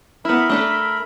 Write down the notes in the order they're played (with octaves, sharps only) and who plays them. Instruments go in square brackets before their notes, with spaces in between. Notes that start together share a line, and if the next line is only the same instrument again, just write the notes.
[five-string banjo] B3 E4 [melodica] A#4 E5 B5
[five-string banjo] A3 D4 A4